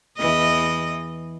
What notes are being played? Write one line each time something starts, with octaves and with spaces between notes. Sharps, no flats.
E2 E3 D#5